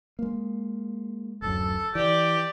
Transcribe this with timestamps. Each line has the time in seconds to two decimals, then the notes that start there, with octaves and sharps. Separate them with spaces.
0.19 G#3 A#3
1.42 D1 F#2 A4
1.95 E3 G4 D5